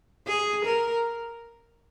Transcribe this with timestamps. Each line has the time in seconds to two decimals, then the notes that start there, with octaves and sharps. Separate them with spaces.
0.27 G#4
0.65 A#4